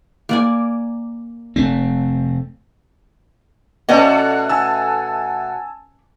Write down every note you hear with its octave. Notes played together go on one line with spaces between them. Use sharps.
A#3 D5 G#5
F1 A3 C4
B2 A3 C#4 F#4 D5 D#5
G#5 A5 E6